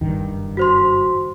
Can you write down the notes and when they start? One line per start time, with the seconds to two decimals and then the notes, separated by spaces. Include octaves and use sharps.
0.01 F#1 G2 D#3
0.57 F#4 C5 C6